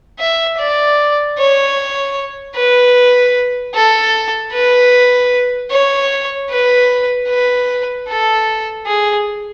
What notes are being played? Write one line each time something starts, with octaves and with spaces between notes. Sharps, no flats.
E5
D5
C#5
B4
A4
B4
C#5
B4
B4
A4
G#4